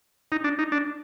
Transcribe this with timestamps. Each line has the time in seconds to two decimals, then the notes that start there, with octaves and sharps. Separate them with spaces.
0.32 D#4
0.44 D4
0.59 D#4
0.72 D4